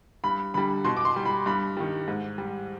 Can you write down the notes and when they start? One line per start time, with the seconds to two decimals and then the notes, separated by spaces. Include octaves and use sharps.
0.24 G2 B5
0.54 D3 G3 B5
0.84 B2 C6
0.97 D6
1.05 C6
1.16 G3
1.25 B5
1.46 G2 B5
1.77 D#3 G3
2.08 G#2
2.38 G3